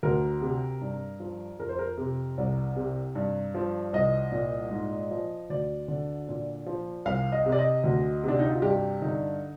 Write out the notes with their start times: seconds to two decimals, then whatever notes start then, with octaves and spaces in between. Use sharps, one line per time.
0.03 D2 A#4
0.41 C3
0.81 G2
1.20 F3
1.59 F2 A#4
1.69 C5
1.79 A#4
1.98 C3
2.38 C2
2.76 C3
3.15 G2
3.54 F3
3.93 C2 D#5
4.32 A#2
4.71 G#2
5.11 F3
5.50 D2 D5
5.88 D3
6.28 A#2
6.66 F3
7.05 C2 F5
7.32 D#5
7.46 C3
7.52 D5
7.59 D#5
7.84 D2
8.23 C3 D4
8.39 D#4
8.50 F4
8.62 G2 G4
9.02 D3 D#4